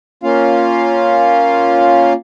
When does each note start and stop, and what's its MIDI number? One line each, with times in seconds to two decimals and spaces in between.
0.23 2.13 58
0.23 2.13 61
0.23 2.13 65
0.23 2.13 77